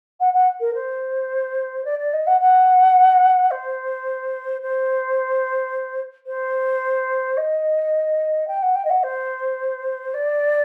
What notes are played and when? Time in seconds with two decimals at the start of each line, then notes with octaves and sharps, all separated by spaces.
0.20 F#5
0.33 F#5
0.60 A#4
0.74 C5
1.85 D5
1.99 D5
2.13 D#5
2.27 F#5
2.40 F#5
3.51 C5
4.61 C5
6.26 C5
7.37 D#5
8.47 G5
8.62 F#5
8.75 G5
8.84 D#5
8.90 F#5
9.03 C5
10.14 D5